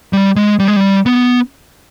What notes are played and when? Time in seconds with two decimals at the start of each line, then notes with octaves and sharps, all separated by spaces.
0.13 G3
0.36 G#3
0.59 G3
0.68 G#3
0.76 G3
1.06 B3